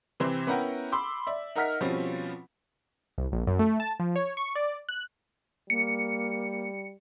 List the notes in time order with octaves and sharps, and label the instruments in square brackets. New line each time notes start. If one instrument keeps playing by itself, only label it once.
[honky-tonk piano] C3 E3 C4 C5
B3 C#4 E4 A#4 F#5 G5
B5 C6 D6 E6
D5 E5
D#4 A#4 E5 F#5 F6 B6
B2 F3 G3 C4 C#4 F4
[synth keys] C2
A#1
F#2
A3
A5
F3
C#5
C#6
D5
F#6
[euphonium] G3 [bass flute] A#3 [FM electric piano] C#7